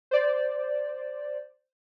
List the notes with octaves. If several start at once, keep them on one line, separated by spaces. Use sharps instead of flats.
C5 D5